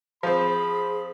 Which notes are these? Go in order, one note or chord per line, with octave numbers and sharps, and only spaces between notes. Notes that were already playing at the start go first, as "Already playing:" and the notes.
F3 C4 G#4 B5